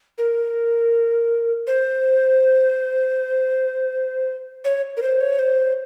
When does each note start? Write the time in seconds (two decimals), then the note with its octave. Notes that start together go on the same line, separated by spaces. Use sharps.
0.18 A#4
1.67 C5
4.65 C#5
4.97 A#4
5.02 C5
5.21 C#5
5.39 C5